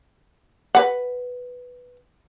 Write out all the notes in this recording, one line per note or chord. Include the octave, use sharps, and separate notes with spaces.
B4 F#5